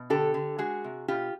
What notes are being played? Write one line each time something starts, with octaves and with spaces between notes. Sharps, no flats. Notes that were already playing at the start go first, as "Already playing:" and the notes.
Already playing: B2
D3 G4 A4
D3
G#3 F#4 G#4
C3
B2 F4 G4